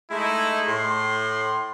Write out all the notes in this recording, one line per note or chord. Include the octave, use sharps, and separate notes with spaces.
G#3 A3 D#4 E4
A2 C6